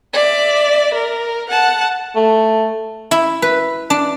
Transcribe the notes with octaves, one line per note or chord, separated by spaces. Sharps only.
D5 E5
A#4
F#5 A5
A3
E4
B4
D4